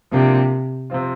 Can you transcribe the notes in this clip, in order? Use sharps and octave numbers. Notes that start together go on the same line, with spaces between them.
C3 F3 A#3 D4
C3 F3 C4 F4